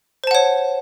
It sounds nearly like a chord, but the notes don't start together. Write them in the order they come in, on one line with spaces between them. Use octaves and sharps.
C5 A5 F#5 C#5